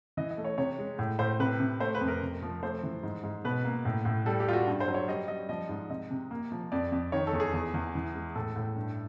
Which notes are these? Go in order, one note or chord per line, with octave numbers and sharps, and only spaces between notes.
E3 D#5
D#5
A3
C#5
C3 C#5
G#3
A2
A2 C5
C3 B4
C3
A3 C5
B4
F2
A#4
C3
F3
A3 C5
E3
G#2
G#2
B2 B4
A#3
A2
A2
G3 A4
G4
G3 F4
F#4
G2
C5
F#3
C#5
G3 D#5
G3 D#5
F3 D#5
G#2
C3 D#5
C3
A#3
F3
F2 D5
F2
D#3 C#5
A4
E2
G#4
E2
E2
E3
G#3
A2 A4
A2
G2